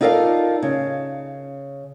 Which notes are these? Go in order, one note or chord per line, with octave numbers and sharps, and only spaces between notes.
D#4 F4 A4 A#4 D5 F5
C#3